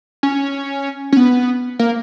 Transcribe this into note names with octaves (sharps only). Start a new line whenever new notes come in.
C#4
C#4
B3
A#3